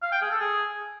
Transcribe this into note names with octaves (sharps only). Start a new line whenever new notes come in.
F5
G5
G#4
A4
G#4